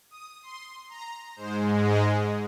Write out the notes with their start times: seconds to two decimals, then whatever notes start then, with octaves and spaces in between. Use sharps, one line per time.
0.11 D#6
0.42 C6
0.89 A#5
1.36 G#2 G#3 C5
1.83 D#5